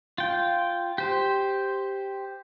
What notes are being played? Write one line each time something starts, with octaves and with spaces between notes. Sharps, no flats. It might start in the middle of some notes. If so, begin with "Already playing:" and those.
F4 G5
G4 C5